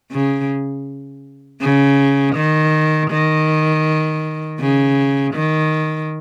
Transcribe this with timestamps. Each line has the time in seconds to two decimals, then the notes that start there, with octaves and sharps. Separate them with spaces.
0.12 C#3
1.61 C#3
2.35 D#3
3.11 D#3
4.59 C#3
5.34 D#3